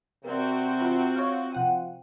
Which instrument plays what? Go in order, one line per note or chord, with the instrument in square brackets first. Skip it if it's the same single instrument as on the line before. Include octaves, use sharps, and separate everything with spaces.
[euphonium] C3 [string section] C4 F#4 [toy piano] A#4 B4 D5
[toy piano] F4 C5 F#5
[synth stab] C#5 F5 [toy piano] E5
[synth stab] C3 F#5 D#7 [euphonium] F3 [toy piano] G5